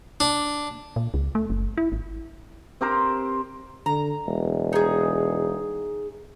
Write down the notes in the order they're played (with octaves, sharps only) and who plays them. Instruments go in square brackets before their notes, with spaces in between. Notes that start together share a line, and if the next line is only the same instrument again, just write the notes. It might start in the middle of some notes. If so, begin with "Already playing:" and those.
[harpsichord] D4
[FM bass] A#2
C#2
A3
F#1
E4
G#1
[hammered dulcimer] C4 G4 A#4 C5
[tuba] D3 [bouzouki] A#5
[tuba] E1
[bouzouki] D#4 G#4